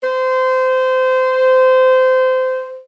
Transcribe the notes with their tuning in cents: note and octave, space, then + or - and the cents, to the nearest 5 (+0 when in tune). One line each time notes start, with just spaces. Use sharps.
C5 -20